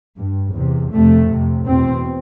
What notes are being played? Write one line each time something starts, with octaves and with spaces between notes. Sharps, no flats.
G2
E2 C3
F2 C3 A3
F2 C3
E2 B2 C4